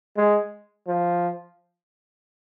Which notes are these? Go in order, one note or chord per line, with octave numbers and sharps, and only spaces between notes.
G#3
F3